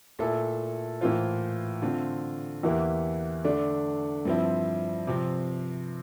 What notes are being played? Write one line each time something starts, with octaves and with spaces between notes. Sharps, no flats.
A#2 A3 E4 A4
A2 E3 A#3 F4 C5
D3 A3 C4 F4
E2 E3 A#3 E4 G4
D3 A3 D4
G2 F3 C4 E4
C3 F3 C4